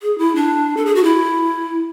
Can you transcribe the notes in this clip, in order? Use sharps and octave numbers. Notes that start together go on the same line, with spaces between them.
G#4
E4
D4
A4
G#4
F#4
E4